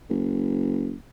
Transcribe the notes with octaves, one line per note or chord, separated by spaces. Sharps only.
F#1